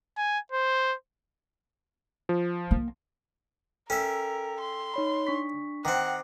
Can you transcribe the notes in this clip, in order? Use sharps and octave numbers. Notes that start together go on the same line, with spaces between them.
G#5
C5
F3
A#3
C#4 A4 A#4 E5 G5 E6
C6
D#4 C#5 B5
D4 C#6 B6
D#3 C4 F#5 D6